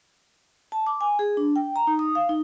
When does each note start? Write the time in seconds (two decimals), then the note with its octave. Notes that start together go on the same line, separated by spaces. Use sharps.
0.72 A5
0.87 D6
1.01 G#5
1.19 G#4
1.37 D4
1.56 G5
1.76 A#5
1.87 D#4
1.99 D#6
2.15 F5
2.29 D#4